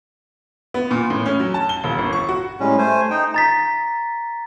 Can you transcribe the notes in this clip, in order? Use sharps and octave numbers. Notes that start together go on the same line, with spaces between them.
B3
A#2
A2
C#4
F#3
A5
G7
D#1
G1
C#6
F#4
A2 G3 G#3 C#4
A3 C5 G#5
D#4 G5
A#5 A6 B6